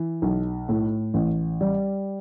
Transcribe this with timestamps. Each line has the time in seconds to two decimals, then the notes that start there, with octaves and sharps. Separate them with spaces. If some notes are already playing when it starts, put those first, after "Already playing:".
Already playing: E3
0.22 B1
0.69 A2
1.14 A1
1.61 G3